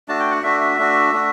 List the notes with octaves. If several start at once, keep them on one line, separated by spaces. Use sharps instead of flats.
A3 D4 F#4 A5
G5
F#5
A3 D4 F#4 E5
E5
A3 D4 F#4
A3 D4 F#4